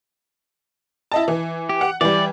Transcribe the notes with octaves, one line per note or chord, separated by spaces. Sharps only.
E4 D#5 A5
E3
G4
F#5
E3 G3 D5